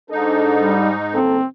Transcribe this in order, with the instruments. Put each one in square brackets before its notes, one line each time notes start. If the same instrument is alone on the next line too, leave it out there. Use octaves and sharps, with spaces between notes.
[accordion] G#2 D#4 [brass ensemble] D4 A4
[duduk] G3
[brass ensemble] F#1 A#3 A4 [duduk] C4